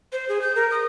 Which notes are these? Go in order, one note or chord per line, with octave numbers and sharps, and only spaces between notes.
C5
G#4
G6
A#4
D#6